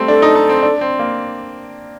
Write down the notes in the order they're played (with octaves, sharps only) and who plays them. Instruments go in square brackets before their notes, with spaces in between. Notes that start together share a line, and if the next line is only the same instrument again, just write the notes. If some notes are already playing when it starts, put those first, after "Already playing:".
Already playing: [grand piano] G3 A3 C4
[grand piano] D4 [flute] A4
[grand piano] D#4
D#4
C4
D4
C4
A#3